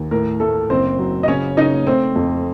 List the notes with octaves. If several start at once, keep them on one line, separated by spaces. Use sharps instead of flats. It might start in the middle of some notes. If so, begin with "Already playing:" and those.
Already playing: D#2
A2 A#4
A3 A4
F#1 C4 C5
F#3
D#5
C#3 C#4 C#5
C#3 D#4 D#5
A3 C4 C5
F2